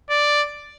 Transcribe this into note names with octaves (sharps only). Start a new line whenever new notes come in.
D5